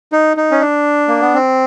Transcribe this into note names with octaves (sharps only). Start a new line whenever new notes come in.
D#4
D#4
C#4
D4
A#3
B3
C4